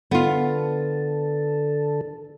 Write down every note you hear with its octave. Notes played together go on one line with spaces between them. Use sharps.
D3 B3 F4 A4